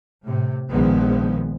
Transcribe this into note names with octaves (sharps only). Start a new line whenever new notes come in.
A2 C3
A#1 D#3 F3 G#3 B3